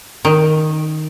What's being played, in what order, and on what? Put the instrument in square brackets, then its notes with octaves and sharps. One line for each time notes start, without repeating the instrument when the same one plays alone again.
[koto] D#3